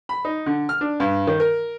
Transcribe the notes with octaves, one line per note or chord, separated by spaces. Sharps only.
B5
D#4
D3
F6
D4
G2
D#3
A#4